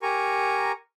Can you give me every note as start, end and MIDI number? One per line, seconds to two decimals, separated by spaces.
0.02 0.72 67
0.02 0.72 70
0.02 0.72 80
0.02 0.72 82
0.02 0.72 85